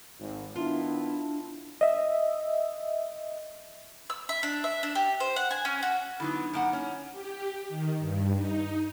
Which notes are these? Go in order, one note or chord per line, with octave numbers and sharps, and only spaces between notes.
G#1
D#3 B3 D4 E4 F4
D#5 E5
E6
E5
D4
E5
D4
G4
C5
F#5
G#5
C#4
F#4
D3 F#3 B3 D#4 E4 B5
F#2 A#3 F#5
C#4
G4
D#3
G2
D#4